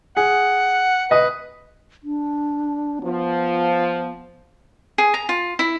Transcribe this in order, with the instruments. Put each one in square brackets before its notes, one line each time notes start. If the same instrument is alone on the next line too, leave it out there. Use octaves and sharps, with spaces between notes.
[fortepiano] G#4 [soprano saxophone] F#5
[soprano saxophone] B4 [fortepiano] D#5 D#6
[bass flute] D4
[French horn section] F3 [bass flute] B3
[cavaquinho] G#4
A#5
F4
E4